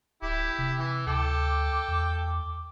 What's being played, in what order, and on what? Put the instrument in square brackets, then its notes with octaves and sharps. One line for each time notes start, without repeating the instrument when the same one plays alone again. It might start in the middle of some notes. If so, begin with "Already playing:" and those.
[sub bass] D1 [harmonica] E4 G4
[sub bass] C3
[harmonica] E3
[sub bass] D2 [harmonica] A4 G5 [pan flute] D6
[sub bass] E2